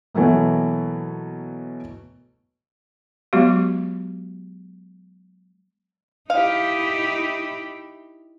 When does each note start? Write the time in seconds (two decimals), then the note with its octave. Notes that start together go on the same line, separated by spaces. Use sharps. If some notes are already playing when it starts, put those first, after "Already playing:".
0.15 B2 E3 F#3 A3 A#3
3.33 F#3 G#3 B3 F#4 G4
6.30 D#4 E4 G4 F5